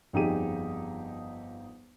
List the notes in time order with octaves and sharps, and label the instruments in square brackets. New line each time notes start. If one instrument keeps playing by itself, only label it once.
[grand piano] G1 F2 D#4 G4 G#4 D#7